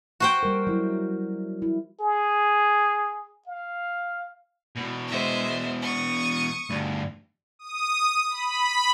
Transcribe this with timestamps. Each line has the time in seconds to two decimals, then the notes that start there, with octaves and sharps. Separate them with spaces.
0.20 F#4 C5 G5
0.43 G3 A#4
0.67 F#3 E4
1.62 E4
2.00 G#4
3.47 F5
4.76 E2 B2
5.08 G#3 C5 E5
5.80 C#6 D#6
6.70 D2 G2
7.59 D#6
8.30 B5